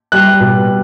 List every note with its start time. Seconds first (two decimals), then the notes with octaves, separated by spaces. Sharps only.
0.12 G3 F#6
0.40 B2